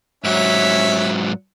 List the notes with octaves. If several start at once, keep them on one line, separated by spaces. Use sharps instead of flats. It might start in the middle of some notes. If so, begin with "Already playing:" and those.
G#2 F#3 C#4 E5